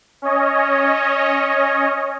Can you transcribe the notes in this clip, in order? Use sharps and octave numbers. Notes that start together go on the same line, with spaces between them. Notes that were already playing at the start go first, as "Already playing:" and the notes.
C#4 C#5 D#5